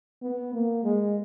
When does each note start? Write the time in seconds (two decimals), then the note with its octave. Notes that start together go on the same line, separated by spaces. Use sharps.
0.22 B3
0.54 A#3
0.84 G#3